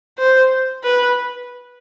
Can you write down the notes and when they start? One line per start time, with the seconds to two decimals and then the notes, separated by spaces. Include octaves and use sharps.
0.19 C5
0.84 B4